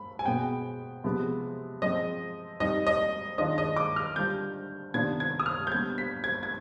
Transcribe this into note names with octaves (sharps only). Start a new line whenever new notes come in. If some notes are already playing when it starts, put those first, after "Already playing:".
Already playing: B5
G#5
B2 G#3 B3 G5
C3 F3 G#3 B3
F3 G#3 C4 D#5
G3 C4 D#4 D#5
D#5
D#3 G#3 D4 F4 D#5
D#5
D6
F6
D3 G3 D4 F4 G6
C3 D#3 B3 D4 F4 G#6
G#6
D#6
F6
G6
D3 G3 B3 G#6
B6
G#6
G#6